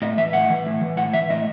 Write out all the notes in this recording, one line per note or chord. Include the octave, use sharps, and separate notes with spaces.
A2 D#5
E3 E5
A2 F#5
E3
A2
E3
A2 F#5
E3 E5
A2 D#5